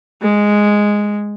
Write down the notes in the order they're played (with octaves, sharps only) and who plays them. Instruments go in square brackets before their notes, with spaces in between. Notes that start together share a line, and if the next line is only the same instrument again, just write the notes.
[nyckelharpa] G#3